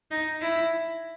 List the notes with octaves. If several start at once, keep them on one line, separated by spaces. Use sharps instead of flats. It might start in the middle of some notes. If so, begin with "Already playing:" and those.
D#4
E4